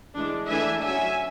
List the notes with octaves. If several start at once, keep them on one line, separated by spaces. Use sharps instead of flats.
E3 G#3 D4
E3 A3 D4 E5 G#5
F#3 C#4 E5 G#5